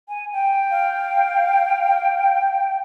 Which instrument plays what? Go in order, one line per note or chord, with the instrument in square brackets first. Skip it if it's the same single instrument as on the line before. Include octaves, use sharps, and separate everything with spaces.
[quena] G#5
G5
[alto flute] F5